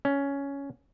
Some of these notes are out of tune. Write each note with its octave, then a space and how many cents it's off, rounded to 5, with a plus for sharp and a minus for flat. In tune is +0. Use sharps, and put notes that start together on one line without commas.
C#4 +10